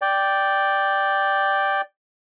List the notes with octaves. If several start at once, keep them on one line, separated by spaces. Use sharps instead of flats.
D5 G5